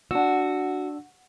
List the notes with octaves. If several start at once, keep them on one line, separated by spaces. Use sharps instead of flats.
D4 F#4 E6